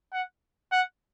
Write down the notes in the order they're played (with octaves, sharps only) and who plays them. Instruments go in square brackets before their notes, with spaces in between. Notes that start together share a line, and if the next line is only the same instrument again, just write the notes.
[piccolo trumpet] F#5
F#5